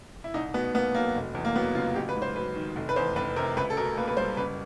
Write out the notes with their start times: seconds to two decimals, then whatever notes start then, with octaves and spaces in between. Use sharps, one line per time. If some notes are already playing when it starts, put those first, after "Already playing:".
0.24 E4
0.34 C2 D#4
0.54 B2 B3
0.75 A#3 B3
0.95 F#3 A#3
1.15 F1
1.35 E2
1.45 A#3
1.55 F#3 B3
1.75 C#3 F4
1.95 A1 G4
2.09 B4
2.15 G#2
2.22 C5
2.36 F#3 B4
2.56 D#3
2.76 F1
2.89 B4
2.96 E2 C5
3.16 F1 B4
3.36 C3 A#4
3.57 C#2 B4
3.70 A4
3.77 B2 A#4
3.97 A#3 B4
4.08 B4
4.17 G3 C5
4.37 F#1 B4